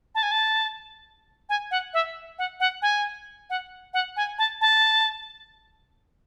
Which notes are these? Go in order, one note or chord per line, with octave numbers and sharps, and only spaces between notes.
A5
G#5
A5
G#5
F#5
E5
F#5
F#5
G#5
F#5
F#5
G#5
A5
A5